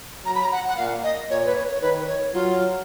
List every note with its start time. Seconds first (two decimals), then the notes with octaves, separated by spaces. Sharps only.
0.25 F#3 A#5
0.34 B5
0.42 A#5
0.52 F#5
0.68 F#5
0.77 A#2 F5
1.03 D#5
1.30 A#2 C#5
1.46 B4
1.55 C#5
1.72 C#5
1.81 D#3 B4
2.08 C#5
2.33 F#3 F4